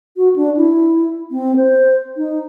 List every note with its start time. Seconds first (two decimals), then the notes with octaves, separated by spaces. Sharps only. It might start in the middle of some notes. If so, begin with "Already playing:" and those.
0.17 F#4
0.36 D4
0.57 E4
1.31 C4
1.56 C5
2.17 D#4